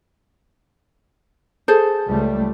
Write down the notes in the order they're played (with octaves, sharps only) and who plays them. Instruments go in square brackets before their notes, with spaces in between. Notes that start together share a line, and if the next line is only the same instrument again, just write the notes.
[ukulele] G#4 A4 C5
[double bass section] C#2 G3 A3